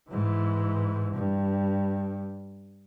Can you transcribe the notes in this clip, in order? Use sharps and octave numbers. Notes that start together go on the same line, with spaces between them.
G#2 E3
G2